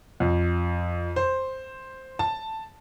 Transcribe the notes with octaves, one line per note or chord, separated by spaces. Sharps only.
F2
C5
A5